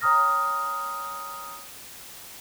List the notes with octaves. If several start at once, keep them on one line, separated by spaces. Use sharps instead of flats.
C#5 G5 A#5 D#6 F6 A#6